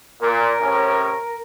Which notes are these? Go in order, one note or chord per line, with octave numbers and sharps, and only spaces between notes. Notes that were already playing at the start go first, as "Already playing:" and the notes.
A#2 A#4
A2 C3 C#4